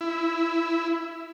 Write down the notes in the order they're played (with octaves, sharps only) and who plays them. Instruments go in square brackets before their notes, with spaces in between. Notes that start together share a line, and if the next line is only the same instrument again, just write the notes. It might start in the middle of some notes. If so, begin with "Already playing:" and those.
[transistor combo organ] E4